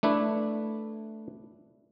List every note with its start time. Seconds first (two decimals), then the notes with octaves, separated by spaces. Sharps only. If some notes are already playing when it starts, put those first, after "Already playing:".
0.03 A3 D4 E4 B4